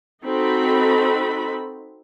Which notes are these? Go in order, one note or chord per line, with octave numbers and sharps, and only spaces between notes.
C4 D#4 F#4 A4 B5